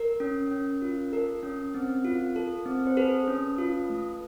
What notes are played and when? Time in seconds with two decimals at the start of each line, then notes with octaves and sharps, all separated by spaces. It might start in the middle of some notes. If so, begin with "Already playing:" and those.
Already playing: A#4
0.20 C#4
0.51 C#4
0.82 F4
1.12 A4 A#4
1.43 C#4
1.74 C4
2.05 F4
2.36 A4
2.66 C4
2.87 C5
2.97 G#4 A4 B4
3.28 C#4
3.58 F4
3.90 A3